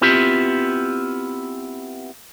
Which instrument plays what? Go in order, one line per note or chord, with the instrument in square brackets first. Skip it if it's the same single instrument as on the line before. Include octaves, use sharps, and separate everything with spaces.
[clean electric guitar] B3 C4 E4 F4 G4